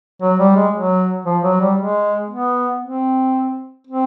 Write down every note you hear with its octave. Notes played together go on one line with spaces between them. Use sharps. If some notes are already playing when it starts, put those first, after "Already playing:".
F#3
G3
G#3
F#3
F3
F#3
G3
G#3
B3
C4
C4